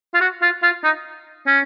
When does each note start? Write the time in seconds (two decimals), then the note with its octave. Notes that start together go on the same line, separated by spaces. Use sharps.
0.14 F4
0.21 F#4
0.42 F4
0.63 F4
0.84 D#4
1.47 C#4